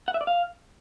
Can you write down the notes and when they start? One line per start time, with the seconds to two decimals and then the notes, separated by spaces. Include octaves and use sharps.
0.08 F#5
0.14 E5
0.21 D5
0.27 F5